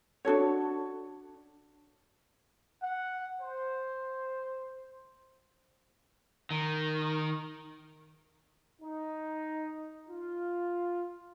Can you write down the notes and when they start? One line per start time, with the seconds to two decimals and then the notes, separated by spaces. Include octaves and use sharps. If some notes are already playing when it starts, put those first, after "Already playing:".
0.25 D4 F#4 A4 C#5
2.83 F#5
3.41 C5
6.51 D#3
8.82 D#4
10.09 F4